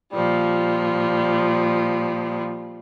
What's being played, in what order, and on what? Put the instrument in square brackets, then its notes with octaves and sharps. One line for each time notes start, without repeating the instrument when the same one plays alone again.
[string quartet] A#2 F3 G3